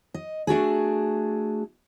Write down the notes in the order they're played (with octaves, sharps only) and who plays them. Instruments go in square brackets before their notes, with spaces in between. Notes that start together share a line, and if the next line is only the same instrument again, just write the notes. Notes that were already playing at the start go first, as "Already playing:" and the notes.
[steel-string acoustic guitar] D#5
A3 D4 F#4 G#4